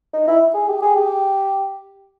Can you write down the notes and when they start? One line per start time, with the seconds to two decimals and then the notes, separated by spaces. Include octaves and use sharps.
0.13 D#4
0.27 E4
0.54 G#4
0.68 G4
0.82 G#4
0.96 G4